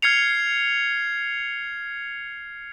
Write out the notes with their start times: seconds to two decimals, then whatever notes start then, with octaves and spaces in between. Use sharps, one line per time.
0.02 F6 G#6 C7 C#7 F7